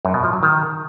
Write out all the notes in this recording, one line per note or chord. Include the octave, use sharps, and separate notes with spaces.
F#2
B2
F3
F#3
D#3